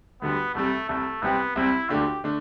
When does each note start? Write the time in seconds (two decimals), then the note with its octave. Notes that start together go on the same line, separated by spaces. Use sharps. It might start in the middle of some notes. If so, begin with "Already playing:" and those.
0.22 D2 D3 G3 B3
0.55 C2 C3 G3 A3
0.89 C2 C3 G3 A3
1.22 C2 C3 G3 B3 C4 G4
1.56 C2 C3 G3 C4 E4 G4
1.90 D2 D3 A3 D4 F4 G4
2.24 D3 A3 D4